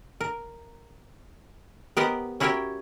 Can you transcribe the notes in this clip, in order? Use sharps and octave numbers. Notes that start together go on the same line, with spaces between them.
A#4
B3 G4 A#4 C5 D#5 F#5
C#4 E4 F#4 G4 A#4 C#5